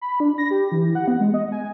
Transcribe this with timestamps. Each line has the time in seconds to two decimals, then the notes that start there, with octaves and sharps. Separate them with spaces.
0.01 B5
0.20 D4
0.38 A#6
0.51 G4
0.72 E3
0.95 F#5
1.08 B3
1.20 G#3
1.34 D#5
1.52 G#5